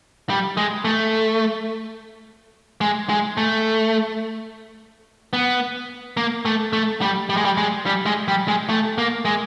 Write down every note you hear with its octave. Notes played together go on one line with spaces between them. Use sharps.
G3
G#3
A3
G#3
G#3
A3
B3
A#3
A3
A3
G3
G3
G#3
G3
G#3
G3
G#3
G3
G#3
A3
A#3
G#3